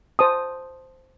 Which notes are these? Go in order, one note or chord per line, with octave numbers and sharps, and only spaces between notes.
C5 A5 D#6